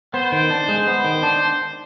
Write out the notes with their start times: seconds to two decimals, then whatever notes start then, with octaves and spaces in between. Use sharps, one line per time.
0.14 B3 C5
0.32 D#3
0.50 D4
0.69 G#3
0.88 B3 C5
1.05 D#3
1.23 D4